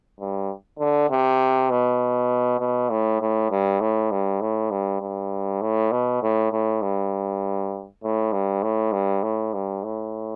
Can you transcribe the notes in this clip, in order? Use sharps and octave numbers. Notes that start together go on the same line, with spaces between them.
G2
D3
C3
B2
B2
A2
A2
G2
A2
G2
A2
G2
G2
A2
B2
A2
A2
G2
A2
G2
A2
G2
A2
G2
A2